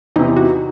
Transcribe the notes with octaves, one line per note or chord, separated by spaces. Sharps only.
E2 C3 E3 D#4
F#4